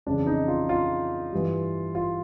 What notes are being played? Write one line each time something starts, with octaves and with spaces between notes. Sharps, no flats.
F2 C#3 E3 D4
D#4
F4
F4
G2 E3
F4